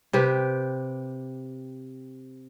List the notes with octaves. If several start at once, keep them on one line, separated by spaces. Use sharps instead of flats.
C3 G4 B4